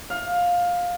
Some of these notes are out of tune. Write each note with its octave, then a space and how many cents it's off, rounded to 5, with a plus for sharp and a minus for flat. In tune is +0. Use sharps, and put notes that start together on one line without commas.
F5 +15